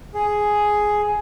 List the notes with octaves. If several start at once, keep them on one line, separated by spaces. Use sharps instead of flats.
G#4